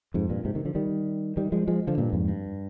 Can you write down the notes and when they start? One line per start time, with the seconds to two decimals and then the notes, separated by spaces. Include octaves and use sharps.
0.14 F2 G#2
0.30 G2 A#2
0.45 G#2 C3
0.55 C3 D#3
0.65 D3 F3
0.75 D#3 G3
1.37 D#3 G3
1.52 F3 G#3
1.68 F3 G#3
1.87 D3 F3
1.98 G2 A#2
2.13 F2 G#2
2.28 G2